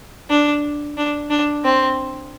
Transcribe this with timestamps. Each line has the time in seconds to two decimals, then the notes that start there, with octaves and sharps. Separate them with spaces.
0.30 D4
0.97 D4
1.30 D4
1.65 C4